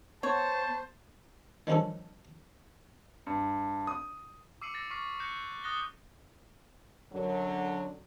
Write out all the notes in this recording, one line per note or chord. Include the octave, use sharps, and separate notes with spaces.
B3 C5 C#5 A5
D#3 F3 G3 C#4 D4 A4
G2
D#6
D6 E6 C7 C#7 D#7 F#7
E6 A6 A#6 C#7
C#6 D6 F6 B6 C7 F#7
F#6 G6 A#6 C#7 E7
D#6 F#6 A6 A#6 G7
F#2 D3 F#3